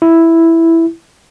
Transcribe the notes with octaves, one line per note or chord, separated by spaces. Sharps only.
E4